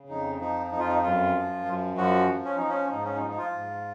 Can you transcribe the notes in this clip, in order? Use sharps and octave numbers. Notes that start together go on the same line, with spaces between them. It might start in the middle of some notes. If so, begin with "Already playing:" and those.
Already playing: C#3
F2 D#4
F3 D#4
F2 D#4
F4
D#4
F#2 F4
F3
F#2
F3 F#4
F3
C#4
F3 D#4
C#4
G#2 D#4
C#4
D#4
F3
D#4
F4
G#2